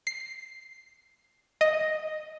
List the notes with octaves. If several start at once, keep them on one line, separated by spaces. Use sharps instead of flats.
C7
D#5